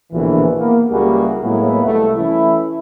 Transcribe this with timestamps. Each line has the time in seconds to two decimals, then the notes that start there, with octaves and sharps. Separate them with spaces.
0.12 A#1 B2 D3 E3
0.58 A#3 B3
0.90 C#2 G3 A#3 E4 F#4 G#4
1.42 A2 F#3 G#3 A#3 B3 E4
1.85 C2 A3
2.16 E3 A3 C#4 E4